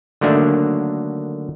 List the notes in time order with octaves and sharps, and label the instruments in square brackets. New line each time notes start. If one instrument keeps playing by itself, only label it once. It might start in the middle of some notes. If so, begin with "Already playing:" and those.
[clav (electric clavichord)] D3 D#3 F#3 A3 A#3 D4